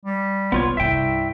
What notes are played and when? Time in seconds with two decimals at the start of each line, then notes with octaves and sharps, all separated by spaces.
0.05 G3
0.52 B1 B3 F4 C#5
0.77 C2 G2 C3 E5 G5